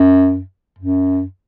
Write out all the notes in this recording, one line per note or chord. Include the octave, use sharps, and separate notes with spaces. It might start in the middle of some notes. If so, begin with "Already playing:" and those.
Already playing: F#2
F#2